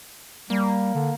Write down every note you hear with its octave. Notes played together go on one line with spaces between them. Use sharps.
G3 A#3
D3